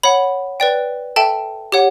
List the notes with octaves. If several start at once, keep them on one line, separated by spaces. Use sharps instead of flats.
C#5 F#5 B5
B4 D5 G5
A4 E5 G5 A5
G4 C#5 F#5